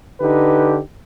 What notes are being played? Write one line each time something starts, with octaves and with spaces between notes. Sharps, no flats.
D3 D#4 G4 B4